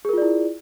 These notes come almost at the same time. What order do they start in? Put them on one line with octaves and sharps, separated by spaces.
G#4 A#4 F4 D5 E4